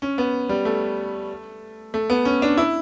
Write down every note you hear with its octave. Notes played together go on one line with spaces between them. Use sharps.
C#4
B3
G3
A3
A3
B3
C#4
D4
E4